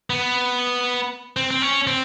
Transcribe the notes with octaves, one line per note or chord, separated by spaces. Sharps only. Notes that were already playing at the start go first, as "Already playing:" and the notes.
B3
C4
C4
C#4
C4